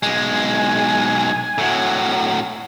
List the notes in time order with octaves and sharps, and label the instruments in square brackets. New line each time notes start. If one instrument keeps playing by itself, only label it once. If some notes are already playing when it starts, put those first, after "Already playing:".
[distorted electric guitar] B1 G#3 [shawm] G#5
[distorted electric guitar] A2 F#3